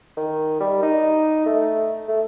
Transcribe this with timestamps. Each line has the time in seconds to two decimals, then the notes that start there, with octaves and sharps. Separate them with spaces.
0.17 D#3
0.61 G3
0.83 D#4
1.46 A3
2.08 A3